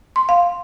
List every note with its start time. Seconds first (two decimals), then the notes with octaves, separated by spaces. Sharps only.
0.16 C6
0.29 F5